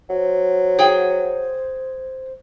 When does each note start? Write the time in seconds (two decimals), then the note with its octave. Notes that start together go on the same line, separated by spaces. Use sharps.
0.10 F#3 C5
0.79 G#4 G5